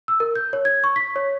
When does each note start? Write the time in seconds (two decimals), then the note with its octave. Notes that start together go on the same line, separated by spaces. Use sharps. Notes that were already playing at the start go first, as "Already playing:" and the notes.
0.08 E6
0.20 A#4
0.36 G6
0.53 C#5
0.65 G#6
0.84 C#6
0.96 B6
1.16 C#5